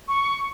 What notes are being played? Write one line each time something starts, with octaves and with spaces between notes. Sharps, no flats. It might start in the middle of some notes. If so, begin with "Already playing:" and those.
C#6